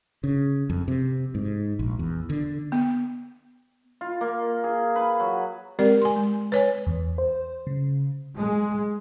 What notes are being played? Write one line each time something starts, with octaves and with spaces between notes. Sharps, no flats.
C#3
F2
C3
G#2
A#1
E2
D3
B3
F4
A#3
G#4
B4
F#3
G#3 C4 G4 A#4 D5
G#5 C6
G#3
B4 C#5 G#5
E2
C5
C#3
G#3